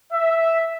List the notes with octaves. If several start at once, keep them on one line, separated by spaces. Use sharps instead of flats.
E5